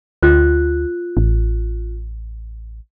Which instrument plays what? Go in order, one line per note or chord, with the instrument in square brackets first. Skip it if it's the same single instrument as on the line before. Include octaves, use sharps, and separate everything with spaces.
[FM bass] D2 [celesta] F4 F#6
[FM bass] A1